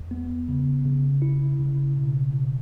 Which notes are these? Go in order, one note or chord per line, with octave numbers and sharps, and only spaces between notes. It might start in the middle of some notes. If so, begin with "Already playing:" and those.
Already playing: E2
B3
C#3
C#3
E4
C#3
B2
B2